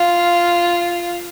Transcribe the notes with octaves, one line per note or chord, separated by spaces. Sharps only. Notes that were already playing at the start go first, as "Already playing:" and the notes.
Already playing: F4